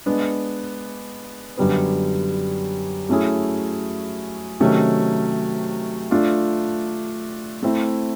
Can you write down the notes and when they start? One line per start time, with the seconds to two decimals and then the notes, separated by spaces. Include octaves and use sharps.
0.06 G#3 B3 D4
1.57 F#2 D3 G3 B3
3.09 F#3 A3 C#4 E4 G#4
4.60 C3 D#3 F#3 A3 C#4
6.11 A3 D4 F4
7.63 A3 C4 E4